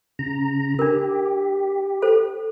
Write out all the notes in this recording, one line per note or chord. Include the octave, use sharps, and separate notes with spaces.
C#3 A#5
D4 G4 A#4
A4 C5